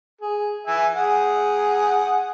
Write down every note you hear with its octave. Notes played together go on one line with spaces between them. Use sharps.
G#4
E5 G#5
G#4 F#5